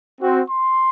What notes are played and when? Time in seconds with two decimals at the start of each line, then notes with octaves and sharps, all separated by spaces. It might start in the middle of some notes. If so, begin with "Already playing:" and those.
0.21 C4 F#4
0.49 C6